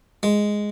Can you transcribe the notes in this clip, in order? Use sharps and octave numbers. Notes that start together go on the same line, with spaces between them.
G#3